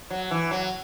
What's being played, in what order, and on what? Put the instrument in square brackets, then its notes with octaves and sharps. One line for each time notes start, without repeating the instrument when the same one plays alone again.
[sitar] F#3
E3
F#3